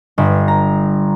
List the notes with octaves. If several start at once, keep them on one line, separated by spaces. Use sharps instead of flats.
G1
A#5